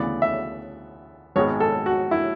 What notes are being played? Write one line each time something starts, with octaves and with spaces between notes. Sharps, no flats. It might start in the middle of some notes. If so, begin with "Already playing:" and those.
Already playing: D2 C#3 E3 B3 D5
E5
G#1 G#2 G#3 B3 C#5
A4
F#4
E4